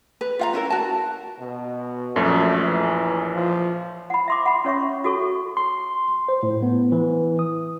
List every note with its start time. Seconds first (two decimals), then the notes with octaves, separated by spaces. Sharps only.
0.21 B4
0.39 F4 F5 A#5
0.53 C#4 E4 A#4
0.70 F#4 A5
1.40 B2
2.16 A#1 F#2 A3
2.65 E3
3.34 F3
4.10 F#5 B5
4.28 E5 C6 D6
4.46 F#5 B5
4.65 C#4 C#5 E5 C#6
5.04 F#4 A4 C#6
5.57 C6
6.28 C5
6.43 A2
6.62 B3
6.92 E3
7.39 D#6